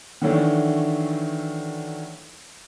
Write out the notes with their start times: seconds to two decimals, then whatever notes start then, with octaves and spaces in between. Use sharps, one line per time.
0.22 D#3 E3 F#3 A3 D4